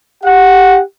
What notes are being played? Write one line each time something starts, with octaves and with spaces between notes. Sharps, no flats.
G4 F#5